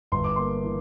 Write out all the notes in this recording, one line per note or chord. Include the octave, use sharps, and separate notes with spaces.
G1 C6
D6
A#3 C6
E3